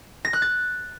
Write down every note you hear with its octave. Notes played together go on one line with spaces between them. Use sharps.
A#6
F#6
A6